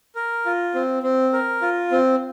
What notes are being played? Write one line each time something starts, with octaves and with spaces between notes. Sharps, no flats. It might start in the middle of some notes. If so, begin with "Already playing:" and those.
A#4
F4
C4
C4
A#4
F4
C4